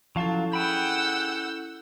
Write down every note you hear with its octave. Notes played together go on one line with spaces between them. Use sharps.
F3 F#3 C#4 E4 A4 F5 A5
G#4 F#5 G5 B5 E6 G6